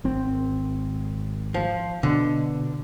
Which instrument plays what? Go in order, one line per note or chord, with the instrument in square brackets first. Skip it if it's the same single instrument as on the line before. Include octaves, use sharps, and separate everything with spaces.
[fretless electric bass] G#1 C4
[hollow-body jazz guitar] F3
[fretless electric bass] B2 [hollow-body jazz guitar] D3